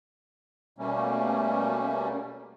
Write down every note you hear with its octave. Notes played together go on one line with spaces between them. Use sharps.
B2 G3 A3 A#3 C#4